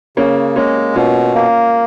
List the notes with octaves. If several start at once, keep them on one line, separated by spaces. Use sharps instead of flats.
C#3 A#3 C#4
G#3 A#3 C#4
B2 C#4 F4
A#3